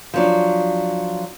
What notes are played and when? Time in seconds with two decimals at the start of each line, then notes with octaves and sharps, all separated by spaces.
0.14 F3 F#3 D4